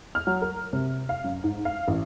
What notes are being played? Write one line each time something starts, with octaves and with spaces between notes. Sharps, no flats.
F6
F#3
A#4
C3
F5
F#2
G#2
F5
A1